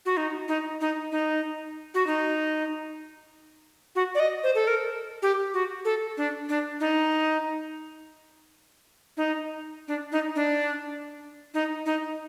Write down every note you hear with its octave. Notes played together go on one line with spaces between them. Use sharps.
F#4
D#4
D#4
D#4
D#4
F#4
D#4
F#4
D5
D#5
C5
A4
A#4
G4
F#4
A4
D4
D4
D#4
D#4
D4
D#4
D4
D#4
D#4